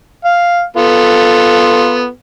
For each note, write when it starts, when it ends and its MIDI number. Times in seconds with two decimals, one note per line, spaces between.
0.24 0.62 77
0.77 2.08 59
0.77 2.08 65
0.77 2.08 69